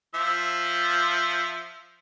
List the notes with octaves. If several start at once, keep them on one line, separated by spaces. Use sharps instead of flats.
F3 E5